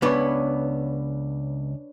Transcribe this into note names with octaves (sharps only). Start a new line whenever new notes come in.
C#2 B3 D4 B4 C#5